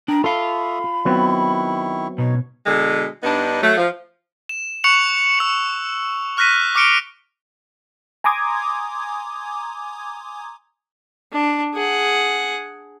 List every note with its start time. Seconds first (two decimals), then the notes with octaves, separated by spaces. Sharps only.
0.08 D4 G5 A#5 D#6
0.24 F4 A4 E5 F5 B5 C#6 D#6
1.05 D#3 F#3 B3 C4 E4 C#6
2.18 B2 D#4 C#5
2.66 B2 D3 G#3
3.23 G2 B3 D4 D#4
3.62 F#3 A3
3.78 F3
4.49 E7
4.84 C#6 F#6 C#7 F7 F#7
5.38 E6 C#7 F7
6.37 C#6 F6 F#6 A#6 B6 D#7
6.75 C#6 D6 F6 C#7 D7 G7
8.24 G#5 A#5 C6 D6 D#6 G#6
11.32 D4
11.74 G#4 F#5